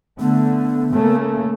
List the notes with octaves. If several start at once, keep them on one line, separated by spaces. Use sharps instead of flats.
D3 A3 B3
C#3 A3 A#3